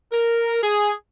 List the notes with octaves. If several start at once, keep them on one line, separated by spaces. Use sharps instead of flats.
A#4
G#4